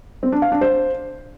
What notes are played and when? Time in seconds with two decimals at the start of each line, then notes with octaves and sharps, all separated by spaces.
0.23 C4
0.32 D4
0.42 F5
0.52 D4
0.61 C5